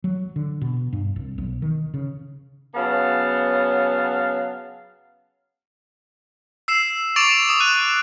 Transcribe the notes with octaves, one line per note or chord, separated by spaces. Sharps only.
F#3
D3
B2
G2
C2
B1
D#3
C#3
C#3 F#3 B3 F5 A5
E6 C7 E7
C#6 D6 A6 D7 F7 F#7
D#6
F#6 D#7